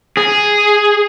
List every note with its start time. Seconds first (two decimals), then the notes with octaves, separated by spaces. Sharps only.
0.17 G#4